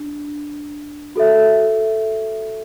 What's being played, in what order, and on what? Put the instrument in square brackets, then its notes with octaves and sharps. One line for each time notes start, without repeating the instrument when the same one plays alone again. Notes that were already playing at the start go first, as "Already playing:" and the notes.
Already playing: [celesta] D4
F#4 A4 E5